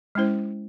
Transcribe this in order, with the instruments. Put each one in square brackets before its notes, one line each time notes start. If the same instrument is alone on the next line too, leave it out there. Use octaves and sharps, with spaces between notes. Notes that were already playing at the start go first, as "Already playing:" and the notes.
[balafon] G#3 C#4 E4 C5